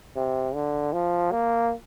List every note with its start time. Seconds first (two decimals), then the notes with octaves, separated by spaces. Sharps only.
0.16 C3
0.54 D3
0.93 F3
1.32 A#3